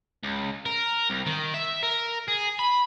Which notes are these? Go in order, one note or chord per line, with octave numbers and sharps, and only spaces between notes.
C#2
A#4
C2
D#3
E5
A#4
G#4
B5